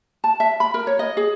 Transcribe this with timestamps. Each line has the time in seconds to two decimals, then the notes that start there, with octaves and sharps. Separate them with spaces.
0.24 A5
0.40 E5
0.60 B5
0.74 A#4
0.87 C#5
0.99 D#5
1.17 G#4